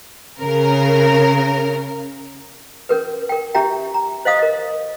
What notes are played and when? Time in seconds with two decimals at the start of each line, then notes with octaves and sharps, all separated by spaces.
0.40 C#3 A#4
2.89 C#4 A#4 B4
3.29 A#4 G5
3.55 C#4 G4 E5 G5 A#5
3.94 A#5
4.25 C5 D#5 F5 D#6
4.39 A#4 D#5